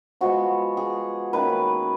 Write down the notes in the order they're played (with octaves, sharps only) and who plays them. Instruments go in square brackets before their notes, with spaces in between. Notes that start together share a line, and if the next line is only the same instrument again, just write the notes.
[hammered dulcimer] F3 G#3 B3 F#4
G#4
D#3 A#3 C#4 B4